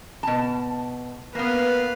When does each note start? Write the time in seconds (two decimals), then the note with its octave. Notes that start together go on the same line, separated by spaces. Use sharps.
0.23 B2 A5
1.35 A#3 B3 B4 F5